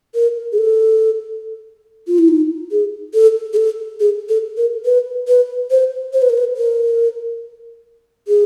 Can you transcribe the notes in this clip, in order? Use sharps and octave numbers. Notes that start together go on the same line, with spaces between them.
A#4
G#4
A4
F4
E4
D#4
G#4
A4
G#4
A4
G#4
A4
A#4
B4
B4
C5
C5
B4
A#4
B4
A#4
G#4